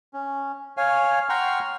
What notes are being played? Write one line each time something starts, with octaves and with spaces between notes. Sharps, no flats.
C#4
C#5 F5 G#5
F#5 G5 A#5 C6 C#6 F6